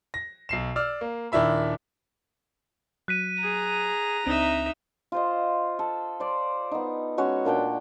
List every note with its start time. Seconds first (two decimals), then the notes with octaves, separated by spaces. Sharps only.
0.14 A#6
0.49 B1 C7 E7
0.76 D5 E6 F6
1.01 A#3
1.32 D#1 D#3 D4 E4 E5 B5
3.08 F#3 F#6 B6 D#7
3.43 G#4 A#5
4.26 C#2 C4 D4 D#4 E5
5.12 F4 C5 D#5
5.79 A4
6.20 C5 D5
6.71 B3 D#4
7.17 G#3 C#4 F#4 C#5
7.45 A#2 D4 F#5 G5